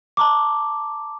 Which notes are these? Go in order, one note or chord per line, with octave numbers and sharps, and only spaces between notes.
A5 A#5 D6